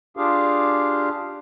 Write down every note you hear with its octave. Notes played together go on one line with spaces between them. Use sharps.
D4 F4 G4 G#4 F5